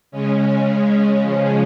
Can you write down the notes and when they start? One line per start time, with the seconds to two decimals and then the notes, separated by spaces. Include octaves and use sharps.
0.11 C#3 G#3 C#4
1.21 C#3 F3 G#3 C#4